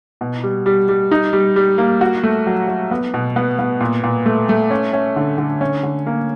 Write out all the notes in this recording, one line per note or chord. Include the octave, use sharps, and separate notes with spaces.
B2
G3
G3
G3
D#4
G3
G3
A#3
F#4
A3
F#3
F#3
B3
B2
B3
B3
A#2
A#2
A3
A3
C#4
C#4
D3
D3
C#4
D3
A#3